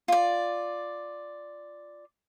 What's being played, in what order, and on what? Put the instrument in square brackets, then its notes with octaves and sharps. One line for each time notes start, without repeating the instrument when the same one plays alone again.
[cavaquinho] F4 D5